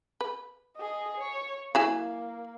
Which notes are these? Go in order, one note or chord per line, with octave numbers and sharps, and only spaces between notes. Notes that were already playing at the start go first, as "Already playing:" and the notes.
B4
G#4 D#5
C#5
F#3 A#3 E4 G#5